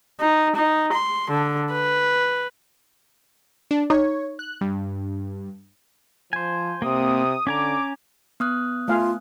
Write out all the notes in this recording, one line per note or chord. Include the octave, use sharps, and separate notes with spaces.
D#4
D#4
C6
D3
B4
D4
D#4 C#5
F#6
G2
F3 C5 G#5
C3 A#3 C4 D#6
D3 C#4 G#5 A#5 D6
B3 D#6 F#6
A3 F4 F5 G#5